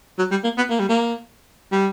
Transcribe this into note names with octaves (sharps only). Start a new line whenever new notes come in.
F#3
G3
A#3
B3
A#3
G3
A#3
G3